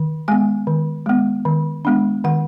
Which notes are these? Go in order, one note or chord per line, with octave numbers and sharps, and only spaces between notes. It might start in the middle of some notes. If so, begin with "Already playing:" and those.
Already playing: D#3
G#3 B3 G#5
D#3
G#3 B3
D#3
G#3 B3 D4
D#3 F#5